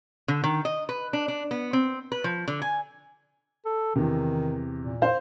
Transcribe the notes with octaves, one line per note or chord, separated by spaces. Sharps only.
D3
D#3
D#5
B4
D4
D4
B3
C4
B4
F3
D3
G#5
A4
E2 C3 D#3
A#2
C5 F5